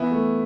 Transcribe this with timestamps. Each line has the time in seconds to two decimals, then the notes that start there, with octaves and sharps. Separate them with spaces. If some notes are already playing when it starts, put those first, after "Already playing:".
Already playing: E3 B3 E4
0.11 A3